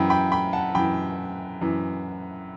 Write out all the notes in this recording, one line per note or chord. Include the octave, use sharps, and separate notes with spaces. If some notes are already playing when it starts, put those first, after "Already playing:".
Already playing: F#2 E3 G5 B5
G5 B5
G5 B5
F#5 A5
F#2 E3 G5 B5
F#2 E3